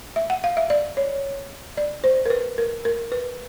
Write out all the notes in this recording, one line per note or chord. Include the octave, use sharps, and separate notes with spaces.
E5
F#5
F5
E5
D5
C#5
D5
C5
A#4
B4
A#4
A#4
B4